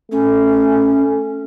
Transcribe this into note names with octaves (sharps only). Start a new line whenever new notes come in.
A3 C#4